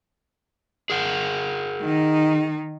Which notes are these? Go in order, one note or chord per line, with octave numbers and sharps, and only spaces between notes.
G#4 A#4 F#5
D#3 D#4